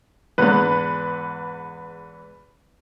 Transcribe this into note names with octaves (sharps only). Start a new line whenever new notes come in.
E2 G#2 B4